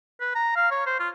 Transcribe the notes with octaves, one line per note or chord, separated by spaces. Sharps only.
B4
A#5
F5
C#5
C5
F4